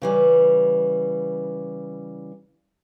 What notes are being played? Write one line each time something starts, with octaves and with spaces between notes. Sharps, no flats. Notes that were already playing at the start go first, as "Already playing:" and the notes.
C#3 E3 G3